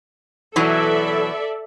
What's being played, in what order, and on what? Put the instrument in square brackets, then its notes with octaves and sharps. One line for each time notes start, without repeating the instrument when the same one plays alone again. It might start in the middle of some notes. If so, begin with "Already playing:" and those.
[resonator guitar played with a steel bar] B2 E3 F#3 [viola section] A4 D5 E5